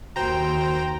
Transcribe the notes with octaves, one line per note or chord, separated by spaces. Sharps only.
D#2 F#4 C5 G5 A#5